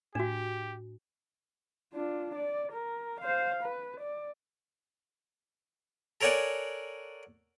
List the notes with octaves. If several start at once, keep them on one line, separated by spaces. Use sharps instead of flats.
A2 D4 F#4 G4
D4 F4
D5
A#4
C5 F5
B4
D5
A4 A#4 C#5 D5 F#5 G#5